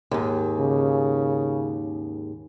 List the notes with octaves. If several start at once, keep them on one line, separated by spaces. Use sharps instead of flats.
D#2 G#2
C#3